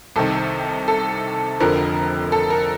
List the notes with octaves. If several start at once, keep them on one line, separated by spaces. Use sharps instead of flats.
C2 C3 D#3 A4
A4
F1 F2 D3 F3 A#4
A4
A#4